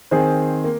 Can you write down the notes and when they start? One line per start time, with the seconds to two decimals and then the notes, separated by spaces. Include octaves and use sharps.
0.11 D#3 C4 G#4 C5
0.64 A#3